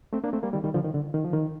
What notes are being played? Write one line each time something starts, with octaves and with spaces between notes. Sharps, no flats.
A3 C4
A#3 D4
A3 C4
G3 A#3
D#3 G3
D#3 G3
D3 F3
D#3
D3
D#3
F3
D#3